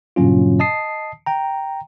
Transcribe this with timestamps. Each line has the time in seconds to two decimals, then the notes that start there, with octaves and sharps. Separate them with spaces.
0.16 G2 A#2 C#3 F#3 C#4 F4
0.59 D#5 A5 D#6 C7
1.26 G5 A#5